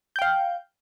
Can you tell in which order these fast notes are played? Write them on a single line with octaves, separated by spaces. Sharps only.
G6 G5 F5